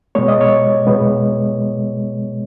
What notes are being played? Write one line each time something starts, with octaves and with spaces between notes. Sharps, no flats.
B2 G#3 B3 C#5
D#5
C#5
B2 G#3 B3